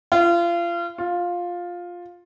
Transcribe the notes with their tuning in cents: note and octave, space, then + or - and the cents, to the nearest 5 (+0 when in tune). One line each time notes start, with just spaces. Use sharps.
F4 -30
F4 +10